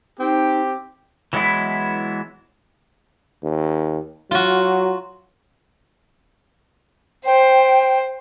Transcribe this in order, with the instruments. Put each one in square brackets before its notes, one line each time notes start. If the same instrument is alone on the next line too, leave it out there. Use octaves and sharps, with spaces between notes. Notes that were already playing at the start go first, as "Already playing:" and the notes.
[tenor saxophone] C4 [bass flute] D#4 [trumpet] G4
[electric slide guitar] E3 F#3 G#3 B3 E4
[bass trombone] D#2
[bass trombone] F#3 [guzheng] F4 F#4
[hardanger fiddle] C5 [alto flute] G5